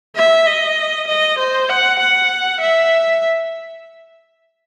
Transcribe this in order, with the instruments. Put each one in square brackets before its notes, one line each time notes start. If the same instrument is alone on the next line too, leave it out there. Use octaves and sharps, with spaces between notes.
[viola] E5
D#5
D#5
C5
F#5
F#5
E5